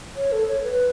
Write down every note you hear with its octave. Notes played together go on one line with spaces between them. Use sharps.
C#5
A4
C#5
B4